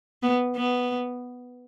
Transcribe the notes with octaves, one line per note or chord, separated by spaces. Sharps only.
B3
B3